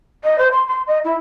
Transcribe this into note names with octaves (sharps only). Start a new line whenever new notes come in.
D#5
C5
C6
C6
D#5
E4